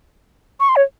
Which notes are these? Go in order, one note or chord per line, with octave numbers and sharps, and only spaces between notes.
C#6
C6
C#5